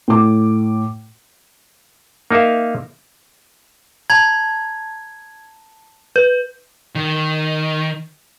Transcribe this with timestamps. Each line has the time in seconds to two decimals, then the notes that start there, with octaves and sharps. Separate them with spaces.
0.08 A2 D6
2.31 A#3 D#4 A#4 E5 F5
4.10 A5 A#5 G#6
6.16 B4 G6
6.95 D#3